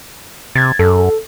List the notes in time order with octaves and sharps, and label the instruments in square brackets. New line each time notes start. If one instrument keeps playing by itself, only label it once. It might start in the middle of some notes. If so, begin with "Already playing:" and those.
[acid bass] C3 [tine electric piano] G#6 A6
[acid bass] F#2 [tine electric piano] A4